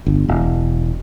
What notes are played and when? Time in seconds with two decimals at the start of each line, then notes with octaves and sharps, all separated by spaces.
0.06 G1
0.28 E1